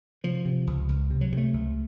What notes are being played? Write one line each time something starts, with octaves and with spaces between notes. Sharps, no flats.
C3 F3
C3
C#2
C#2
C3
F#3
C3 A3
C#2